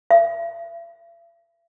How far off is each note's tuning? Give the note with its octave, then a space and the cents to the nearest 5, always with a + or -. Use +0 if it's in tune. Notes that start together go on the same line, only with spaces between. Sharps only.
E5 +45